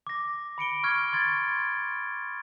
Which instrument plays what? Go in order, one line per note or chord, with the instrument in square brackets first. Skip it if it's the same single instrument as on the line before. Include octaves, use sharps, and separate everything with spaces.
[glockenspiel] D6 A#6
B5 C#7 D7 G7
C#6 F6 G#6
C6 G#6 A6